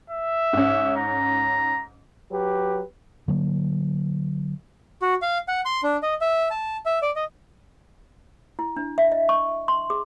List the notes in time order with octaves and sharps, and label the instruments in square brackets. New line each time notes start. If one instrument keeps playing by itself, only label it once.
[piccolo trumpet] E5
[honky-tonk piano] G#2 C#4
[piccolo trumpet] A#5
[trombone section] F#3 G4 B4
[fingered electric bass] D3 F#3 A#3
[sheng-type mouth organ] F#4
F5
F#5
C6
D4
D#5
E5
A5
E5
D5
D#5
[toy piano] E4
D4
E5
D#5
C#6
C6
G#4